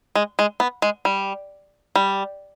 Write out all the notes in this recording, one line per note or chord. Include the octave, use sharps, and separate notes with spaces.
G#3
G#3
B3
G#3
G3
G3